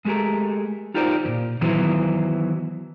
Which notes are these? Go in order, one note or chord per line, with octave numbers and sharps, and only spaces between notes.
G#3 A3 G4 G#4 A#4
D#4 F4 G4 A#4 C5 D5
E2 A#2
D#3 E3 F#3 B3 E4 C5